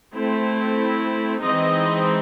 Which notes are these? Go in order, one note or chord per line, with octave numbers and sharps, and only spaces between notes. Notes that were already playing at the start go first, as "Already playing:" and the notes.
A3 C4 E4
E3 G#3 C4 D#4 D#5